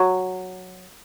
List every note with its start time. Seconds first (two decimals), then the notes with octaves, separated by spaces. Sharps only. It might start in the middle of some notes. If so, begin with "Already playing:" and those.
Already playing: F#3